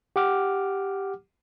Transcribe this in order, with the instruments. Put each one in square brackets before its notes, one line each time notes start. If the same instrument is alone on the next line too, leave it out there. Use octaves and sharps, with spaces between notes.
[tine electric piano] G4 F#5 D6 F6